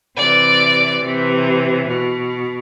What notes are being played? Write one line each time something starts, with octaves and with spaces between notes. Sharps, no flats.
C3 E3 D5
C3 E3
B2